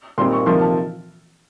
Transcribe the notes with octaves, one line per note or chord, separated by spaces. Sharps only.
A#2 G3 C4 D#4 C6
C#6
C3 F3 A#3 D#4 C6
A5